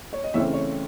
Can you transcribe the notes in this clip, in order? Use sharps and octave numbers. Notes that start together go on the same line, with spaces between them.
C#5
D#5
C#3 E3 A3 C4 C#5 E5
C#5